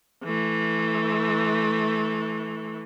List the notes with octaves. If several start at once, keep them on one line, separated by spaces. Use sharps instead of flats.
E3 A3